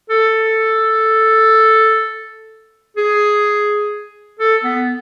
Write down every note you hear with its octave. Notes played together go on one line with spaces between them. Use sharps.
A4
G#4
A4
B3